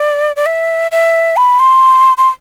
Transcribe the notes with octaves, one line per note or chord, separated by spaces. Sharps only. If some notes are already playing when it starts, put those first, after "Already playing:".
Already playing: D5
D5
E5
E5
B5
C6
C6